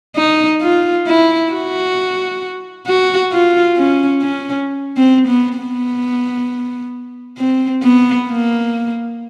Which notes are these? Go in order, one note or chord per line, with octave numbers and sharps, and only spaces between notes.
D#4
F4
E4
F#4
F#4
F4
C#4
C#4
C4
B3
B3
C4
B3
A#3